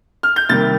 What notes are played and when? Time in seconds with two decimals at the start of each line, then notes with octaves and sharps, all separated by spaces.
0.23 F6
0.36 G6
0.49 C2 C3 D#3 G3 A#3 A6